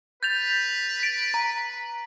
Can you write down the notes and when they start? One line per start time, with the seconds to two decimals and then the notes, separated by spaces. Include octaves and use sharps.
0.23 B4 G6 A6 F7
1.00 A6 D7
1.34 A#5